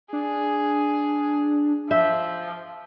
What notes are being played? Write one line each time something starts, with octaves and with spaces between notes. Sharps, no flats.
D4 G#4
F3 E5 G6